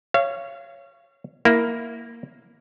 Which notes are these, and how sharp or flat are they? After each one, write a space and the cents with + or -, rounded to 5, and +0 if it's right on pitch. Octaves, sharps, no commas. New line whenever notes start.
C#5 +0 F5 -35
A#3 +0 E4 +0